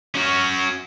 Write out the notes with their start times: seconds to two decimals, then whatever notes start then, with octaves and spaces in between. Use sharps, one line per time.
0.15 C#4 F#4